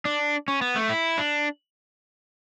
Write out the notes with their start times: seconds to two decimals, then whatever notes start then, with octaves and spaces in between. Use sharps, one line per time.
0.05 D4
0.48 C#4
0.62 B3
0.76 A3
0.89 E4
1.18 D4